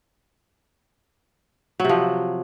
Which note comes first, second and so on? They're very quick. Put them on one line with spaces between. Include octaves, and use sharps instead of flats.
F#3 C3 F3